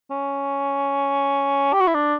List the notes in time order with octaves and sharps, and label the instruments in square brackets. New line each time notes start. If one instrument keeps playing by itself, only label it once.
[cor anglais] C#4
G4
F#4
E4
D4